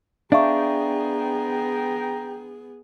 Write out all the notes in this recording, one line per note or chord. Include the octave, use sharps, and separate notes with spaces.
B3 D4 G#4 E5 F5 G5 A#5 C#6